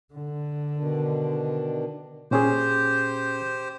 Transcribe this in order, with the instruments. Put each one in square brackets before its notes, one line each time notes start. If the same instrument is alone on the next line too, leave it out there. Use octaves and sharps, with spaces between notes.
[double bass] D3
[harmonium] B2 D#3 D4
[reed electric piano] A#2 C#4 G#4 [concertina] G4 C5